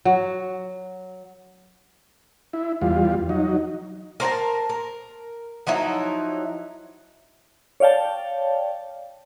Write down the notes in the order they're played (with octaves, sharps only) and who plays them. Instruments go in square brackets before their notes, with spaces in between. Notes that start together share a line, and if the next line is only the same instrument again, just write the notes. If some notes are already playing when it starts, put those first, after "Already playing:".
[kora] F#3
[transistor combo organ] E4
E2 G3 F4
F#3 D#4
[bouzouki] A#4 C5 F#5 A5
A#4
F3 F#3 D#4 E4
[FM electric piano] C#5 D5 F5 G5 A5